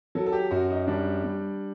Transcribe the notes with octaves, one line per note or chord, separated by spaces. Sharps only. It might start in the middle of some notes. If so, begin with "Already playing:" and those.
F#3 A4
A4
G4
F#2 F#4
D#4
G3 D4
G3